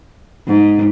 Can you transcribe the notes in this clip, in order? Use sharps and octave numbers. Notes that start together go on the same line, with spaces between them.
G#2